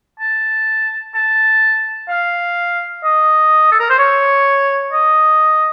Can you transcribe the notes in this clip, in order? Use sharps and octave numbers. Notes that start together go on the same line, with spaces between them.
A5
A5
F5
D#5
A4
A#4
C5
C#5
D#5